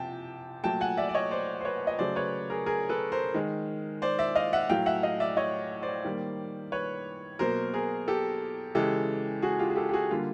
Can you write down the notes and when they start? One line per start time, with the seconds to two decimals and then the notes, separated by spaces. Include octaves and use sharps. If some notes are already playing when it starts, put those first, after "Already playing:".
Already playing: C3 F3 G5 A5
0.63 A#2 F#3 A3 G5 A5
0.81 F#5 G#5
0.97 D5 E5
1.09 D5
1.14 C#5 D#5
1.31 C5 D5
1.61 C5
1.65 B4 C#5
1.87 D#5
1.99 C#3 F#3 A3 C5 D5
2.16 B4 C#5
2.50 G#4 A#4
2.66 G#4 A#4
2.89 A4 B4
3.12 A#4 C5
3.34 D#3 G#3
4.02 C5 D5
4.19 D5 E5
4.35 D#5 F5
4.53 E5 F#5
4.69 A2 F#3 A3 F5 G5
4.86 E5 F#5
5.03 D#5 F5
5.20 D5 E5
5.37 C#5 D#5
5.82 C5 D5
6.05 D#3 G3 A#3
6.72 B4 C#5
7.39 B2 F#3 A#3 A#4 C5
7.74 G#4 A#4
8.08 G4 A4
8.75 C#3 E3 G#3 G4 A4
9.42 F#4 G#4
9.59 F4 G4
9.70 G#4
9.76 G4 A4
9.89 G4
9.93 F#4 G#4
10.10 D3 G3 A#3 F4